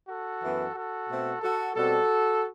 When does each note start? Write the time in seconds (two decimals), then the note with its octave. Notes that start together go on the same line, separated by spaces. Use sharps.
0.09 F#4 A4
0.42 F#2 E3 B3
0.75 F#4 A4
1.08 B2 A3 C4
1.42 F#4 A4
1.75 B2 G3 C4 F#4 A4